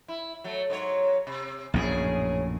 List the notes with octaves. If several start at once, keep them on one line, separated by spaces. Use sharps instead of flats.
E4
F#3 A3
G#2 F#3 C#5
C3
A#1 F#2 A2 C#3 G4 G#4